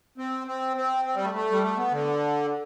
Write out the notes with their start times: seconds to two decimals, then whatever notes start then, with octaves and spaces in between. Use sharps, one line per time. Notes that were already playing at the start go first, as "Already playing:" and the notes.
0.18 C4
0.47 C4
0.77 C4
1.05 C4
1.15 G3
1.24 A3
1.34 A3
1.52 G3
1.63 A3
1.77 B3
1.92 D3